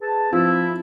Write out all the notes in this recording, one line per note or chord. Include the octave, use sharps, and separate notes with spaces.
G#4 B4 A5
F3 C4 E4